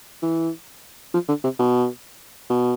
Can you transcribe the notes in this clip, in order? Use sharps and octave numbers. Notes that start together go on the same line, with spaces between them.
E3
F3
D3
C3
B2
B2